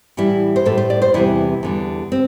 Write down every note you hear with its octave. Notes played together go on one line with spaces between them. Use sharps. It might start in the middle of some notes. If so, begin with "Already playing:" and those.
A2 E3 G3 E4
C5
A2 G3 A4
C5
D5
C5
E2 C3 E3 G3 E4
E2 D3 G3
C4